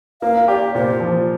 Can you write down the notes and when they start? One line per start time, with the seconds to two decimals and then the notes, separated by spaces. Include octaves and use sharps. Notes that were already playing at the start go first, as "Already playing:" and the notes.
0.22 A#3 F5
0.48 G4 D5
0.75 A#2 C5
1.00 F3